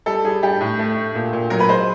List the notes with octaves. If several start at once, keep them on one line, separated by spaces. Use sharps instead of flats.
G3 A4
G3 G#4
G3 G4
A2
A3
A3
A#2
A#2
F#3 A#4
B4
G#3 C5